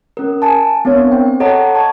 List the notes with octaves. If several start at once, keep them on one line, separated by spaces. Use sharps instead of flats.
C#4 A#4
G#5 A5
B3 C4 D4 A#4 C#5
C5 G5
A4 C#5 D#5 F#5 A5 A#5
A5 A#5 C#6 G#6